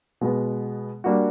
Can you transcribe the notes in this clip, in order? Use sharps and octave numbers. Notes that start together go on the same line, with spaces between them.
B2 G#3 B3
G3 A#3 D4 F#4